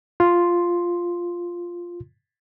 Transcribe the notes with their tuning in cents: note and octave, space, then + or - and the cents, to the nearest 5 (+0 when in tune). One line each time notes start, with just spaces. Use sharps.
F4 +0 C6 +0